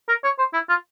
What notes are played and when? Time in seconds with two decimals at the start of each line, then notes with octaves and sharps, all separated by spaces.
0.08 A#4
0.24 C#5
0.39 C5
0.53 E4
0.69 F4